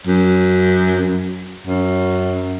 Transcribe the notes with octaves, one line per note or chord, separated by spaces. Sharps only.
F#2
F#2